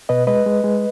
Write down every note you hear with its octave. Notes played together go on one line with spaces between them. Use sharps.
B2 B4 D#5
G#3 B4 D#5
G#3
G#3